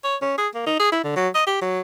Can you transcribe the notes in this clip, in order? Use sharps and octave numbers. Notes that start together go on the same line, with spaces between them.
C#5
C#4
G#4
A#3
D#4
G#4
E4
D3
F#3
D#5
G4
F#3